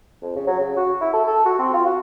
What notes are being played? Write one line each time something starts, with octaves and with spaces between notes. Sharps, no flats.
F2
C#3
F#3
C#3
F#4
E4
A4
A4
F#4
C4
F4
F#4